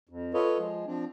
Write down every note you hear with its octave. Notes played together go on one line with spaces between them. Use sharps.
F2
F4 A4 B4 C#5 D#5
F3 G#3
F3 C4 D4